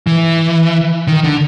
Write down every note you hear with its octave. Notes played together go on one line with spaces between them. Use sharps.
E3
D#3
D3